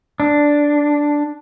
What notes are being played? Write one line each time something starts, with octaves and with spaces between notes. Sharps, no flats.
D4